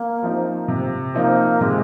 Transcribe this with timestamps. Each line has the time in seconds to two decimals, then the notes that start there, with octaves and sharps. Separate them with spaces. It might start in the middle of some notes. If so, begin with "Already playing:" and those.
Already playing: A#3
0.22 F3 C4 D#4
0.68 C3
1.14 F3 A#3 C4 D#4
1.61 C3 G#3